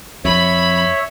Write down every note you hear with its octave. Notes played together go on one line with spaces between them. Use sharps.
F2 C#5 E5 B5